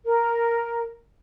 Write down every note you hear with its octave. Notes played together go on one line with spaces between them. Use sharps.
A#4